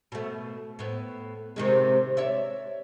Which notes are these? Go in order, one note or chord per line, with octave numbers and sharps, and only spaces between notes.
B2 A3
A2 B3
C3 D#3 G#3
C#5 D5 E5